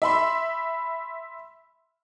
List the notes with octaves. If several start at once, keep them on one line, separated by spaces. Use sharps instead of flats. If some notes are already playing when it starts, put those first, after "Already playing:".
E5 B5 C6